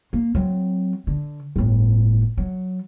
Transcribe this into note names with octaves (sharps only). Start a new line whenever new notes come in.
A#3
F#3 C4
D3
G1 A2
F#3